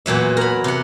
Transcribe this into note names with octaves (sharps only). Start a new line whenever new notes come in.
E2 A#2 F#3 E5
A#4 B5
C3 F#5